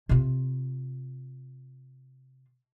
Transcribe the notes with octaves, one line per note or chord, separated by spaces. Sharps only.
C3 F4